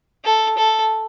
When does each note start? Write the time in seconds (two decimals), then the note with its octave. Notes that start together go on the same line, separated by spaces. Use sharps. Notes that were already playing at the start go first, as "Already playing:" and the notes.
0.24 A4
0.57 A4